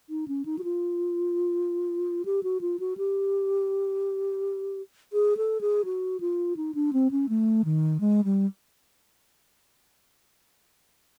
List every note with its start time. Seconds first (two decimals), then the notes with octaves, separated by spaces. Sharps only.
0.10 D#4
0.28 C#4
0.45 D#4
0.58 F#4
0.64 F4
2.25 G4
2.43 F#4
2.61 F4
2.79 F#4
2.97 G4
5.13 G#4
5.37 A4
5.61 G#4
5.85 F#4
6.20 F4
6.56 D#4
6.74 D4
6.93 C4
7.11 C#4
7.29 A3
7.65 D#3
8.00 G#3
8.24 G3